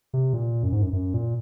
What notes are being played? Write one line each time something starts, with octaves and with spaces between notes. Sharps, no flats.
C3
A#2
F#2
G#2
F#2
F#2
A#2